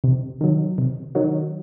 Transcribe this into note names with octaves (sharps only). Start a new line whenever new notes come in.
C3
D#3 F#3
C3
D#3 F#3